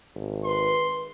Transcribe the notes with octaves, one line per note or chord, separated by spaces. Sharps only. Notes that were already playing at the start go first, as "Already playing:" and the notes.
G#1
B4 C6